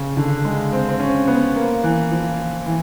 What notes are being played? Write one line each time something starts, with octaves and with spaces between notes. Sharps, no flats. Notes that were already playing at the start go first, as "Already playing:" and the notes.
Already playing: C#3
D3
G#3
C4
C4
C#4
B3
A#3
E3
F3
E3